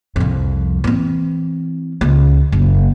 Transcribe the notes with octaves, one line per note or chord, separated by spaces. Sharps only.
C2 F2
E3 C4
C#2
F#1